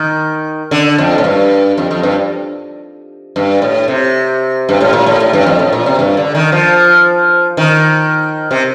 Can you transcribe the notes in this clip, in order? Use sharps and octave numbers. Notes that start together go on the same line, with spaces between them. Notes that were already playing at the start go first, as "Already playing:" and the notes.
Already playing: D#3
D3
F2
A2
G2
F2
F2
G2
G2
A2
C3
G2
A2
A#2
A2
A2
G2
F2
A2
A#2
C3
G2
D3
D#3
F3
D#3
C3